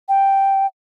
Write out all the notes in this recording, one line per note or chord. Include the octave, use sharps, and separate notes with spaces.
G5